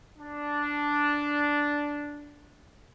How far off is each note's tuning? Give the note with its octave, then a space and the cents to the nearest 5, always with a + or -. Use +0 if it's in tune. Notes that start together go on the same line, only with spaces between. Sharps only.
D4 -5